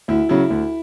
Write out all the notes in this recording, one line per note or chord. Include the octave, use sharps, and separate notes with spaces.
D2 E4
C#3 F#3 E4
D2